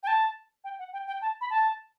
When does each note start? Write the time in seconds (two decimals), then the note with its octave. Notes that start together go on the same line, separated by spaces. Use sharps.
0.03 G5
0.07 A5
0.64 G5
0.79 F#5
0.93 G5
1.07 G5
1.21 A5
1.41 B5
1.50 A5